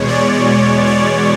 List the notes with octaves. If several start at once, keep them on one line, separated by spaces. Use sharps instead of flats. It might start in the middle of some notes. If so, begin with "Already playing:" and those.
Already playing: E2 B2 G#3 C#5
D5
D5